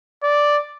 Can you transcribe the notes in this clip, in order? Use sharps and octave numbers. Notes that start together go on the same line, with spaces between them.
D5